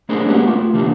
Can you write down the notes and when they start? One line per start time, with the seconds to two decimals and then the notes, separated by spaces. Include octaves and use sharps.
0.09 A3 D4 G#4 A#4 C5 D5
0.26 G#3 A#3 B3 C#4 F#4 G4
0.47 A3 F4
0.73 C3 E3 A3 A#3 D4 G4